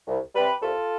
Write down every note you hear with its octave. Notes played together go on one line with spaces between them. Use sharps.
C2
C3 G3 G4 B4
C2 F4 A4